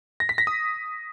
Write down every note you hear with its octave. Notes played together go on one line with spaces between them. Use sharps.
A#6
B6
A#6
D#6